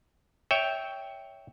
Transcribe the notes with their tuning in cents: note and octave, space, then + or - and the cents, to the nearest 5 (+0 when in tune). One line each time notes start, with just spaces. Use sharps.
C#5 +15 E5 -15 G5 +0